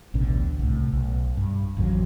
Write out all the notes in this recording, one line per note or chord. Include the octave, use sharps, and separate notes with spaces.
A1 D2 B2 D3
C2 A2
B1
G2
A1 F2 D#3 F#3